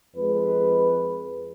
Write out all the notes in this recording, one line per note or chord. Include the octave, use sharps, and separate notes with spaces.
F2 G#3 B4